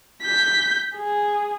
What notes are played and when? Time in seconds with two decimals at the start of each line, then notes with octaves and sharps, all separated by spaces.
0.22 G6 B6
0.95 G#4